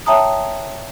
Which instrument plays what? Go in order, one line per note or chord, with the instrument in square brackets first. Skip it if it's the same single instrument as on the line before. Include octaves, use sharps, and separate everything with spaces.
[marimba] C#5 E5 G5 A5 A#5 D#6